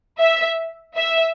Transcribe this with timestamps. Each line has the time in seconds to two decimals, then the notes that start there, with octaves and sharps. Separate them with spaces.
0.20 E5
0.96 E5